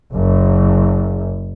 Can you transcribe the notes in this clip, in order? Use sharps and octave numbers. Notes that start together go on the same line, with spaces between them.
F#1